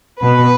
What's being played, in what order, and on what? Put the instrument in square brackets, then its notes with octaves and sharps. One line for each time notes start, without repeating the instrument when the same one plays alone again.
[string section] B2 B4